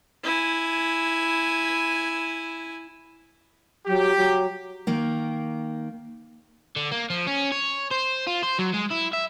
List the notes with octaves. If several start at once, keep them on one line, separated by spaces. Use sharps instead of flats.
E4 G#5
F#3 G4
F#3
D#3 A#3
D3
A#3
F3
C#4
C#5
C5
F4
C5
F#3
G#3
E4
E5